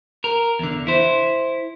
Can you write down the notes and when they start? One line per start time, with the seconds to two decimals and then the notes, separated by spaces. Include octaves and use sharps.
0.24 A#4
0.59 E2 D3
0.87 E4 C5